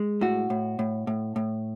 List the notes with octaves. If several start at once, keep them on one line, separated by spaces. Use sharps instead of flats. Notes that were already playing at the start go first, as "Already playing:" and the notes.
Already playing: G#3
A2 F#4
A2
A2
A2
A2